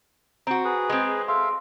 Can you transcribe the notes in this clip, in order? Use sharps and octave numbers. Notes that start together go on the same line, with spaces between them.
C4 F#4 A#5
G#4 B4
G#3 C4
A4 E5 F5 C6